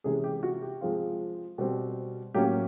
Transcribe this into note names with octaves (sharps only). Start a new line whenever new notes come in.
C3 E3 G#3 C#4 G#4
G4
F#4
G4
F3 G#3 C4 F4
B2 G3 C4
A2 F#3 A#3 C#4 G4